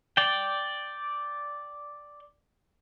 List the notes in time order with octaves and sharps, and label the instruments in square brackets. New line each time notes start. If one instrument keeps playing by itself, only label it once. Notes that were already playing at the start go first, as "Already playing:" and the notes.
[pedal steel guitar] D5 G5